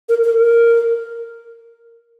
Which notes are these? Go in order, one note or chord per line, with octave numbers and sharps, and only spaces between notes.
A#4
A#4
A#4